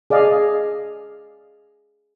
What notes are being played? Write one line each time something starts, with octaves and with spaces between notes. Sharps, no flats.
G#4 D5 D#5 F5